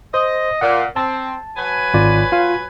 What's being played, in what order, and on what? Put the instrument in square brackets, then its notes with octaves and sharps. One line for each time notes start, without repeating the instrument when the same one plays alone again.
[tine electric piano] C5 [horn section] D#5
[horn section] A#2 [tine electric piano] F#5
[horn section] C4 [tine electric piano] A5
[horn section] F#3 B4 G#5
[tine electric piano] G#1 F4 D5
F4 F5